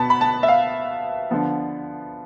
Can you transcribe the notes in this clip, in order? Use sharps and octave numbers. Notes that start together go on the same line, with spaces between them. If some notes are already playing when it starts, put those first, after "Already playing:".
Already playing: B2 B3 A5 B5
B5
A5
E5
F5
D3 F3 B3